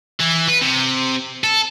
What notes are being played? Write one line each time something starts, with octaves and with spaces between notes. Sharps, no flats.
E3
B4
C3
A4